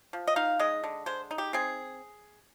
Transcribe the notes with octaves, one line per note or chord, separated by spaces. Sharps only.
F3
D#5
D#4 F5
G#3 D#5
D3
G#3 C5
D#4
G4
C4 G#4